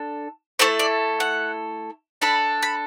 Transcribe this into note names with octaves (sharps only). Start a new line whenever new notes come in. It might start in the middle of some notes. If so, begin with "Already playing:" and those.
Already playing: D4 A4
A3 E4 A4 C5
D5
F#5
D4 A4 B5
B5